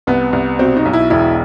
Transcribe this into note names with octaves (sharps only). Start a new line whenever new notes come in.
C2 B3
C2
B2 C4
D#4
B1
E4
E1 E4